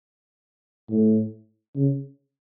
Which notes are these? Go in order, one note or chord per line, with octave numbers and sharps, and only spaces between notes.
A2
C#3